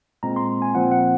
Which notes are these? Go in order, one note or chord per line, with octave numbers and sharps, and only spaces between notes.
A#2 G#3 C4 A#5
C6
G#5
A#2 F3 C4 F#5
F#5